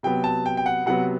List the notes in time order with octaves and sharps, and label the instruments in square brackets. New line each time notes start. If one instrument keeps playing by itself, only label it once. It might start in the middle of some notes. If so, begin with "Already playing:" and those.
[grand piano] C3 F#3 B3 G5
A5
G5
G5
F#5
C3 F#3 B3 F#5